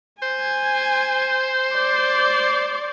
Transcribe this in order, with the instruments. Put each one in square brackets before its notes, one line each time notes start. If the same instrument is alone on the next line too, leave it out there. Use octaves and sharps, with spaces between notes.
[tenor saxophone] C5 [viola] G#5
[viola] D5